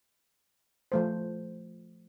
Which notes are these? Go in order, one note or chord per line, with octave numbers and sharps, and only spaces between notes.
F3 A3 C5